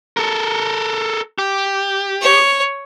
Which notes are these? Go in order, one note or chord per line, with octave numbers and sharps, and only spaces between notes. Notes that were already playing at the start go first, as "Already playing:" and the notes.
A4 A#4
G4
C#5